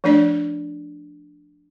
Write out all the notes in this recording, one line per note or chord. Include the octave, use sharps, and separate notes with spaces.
F3 A3 D4 D5